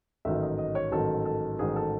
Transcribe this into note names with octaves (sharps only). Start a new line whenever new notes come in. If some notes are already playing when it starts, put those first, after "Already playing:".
A1 G#2 D#3 F#3 E5
D#5
D#5
C#5
A1 G#2 D#3 F#3 A4
A4
A1 G#2 D#3 F#3 G#4
A4